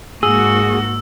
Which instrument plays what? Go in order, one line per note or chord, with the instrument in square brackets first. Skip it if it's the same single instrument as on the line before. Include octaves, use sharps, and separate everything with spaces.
[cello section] G#2 A#3 F#4 [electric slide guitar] G#4 [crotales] E6